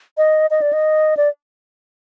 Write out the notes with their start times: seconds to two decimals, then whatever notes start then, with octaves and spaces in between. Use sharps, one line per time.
0.18 D#5
0.51 D#5
0.62 D5
0.73 D#5
1.17 D5